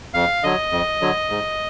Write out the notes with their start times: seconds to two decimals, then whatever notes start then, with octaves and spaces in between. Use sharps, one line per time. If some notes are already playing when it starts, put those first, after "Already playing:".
0.14 F2 F5
0.43 D3 F#3 D#5
0.72 F2
1.01 D3 F#3
1.30 G#2